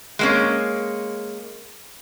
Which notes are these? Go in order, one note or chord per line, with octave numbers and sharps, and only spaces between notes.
G#3 A#3 C#4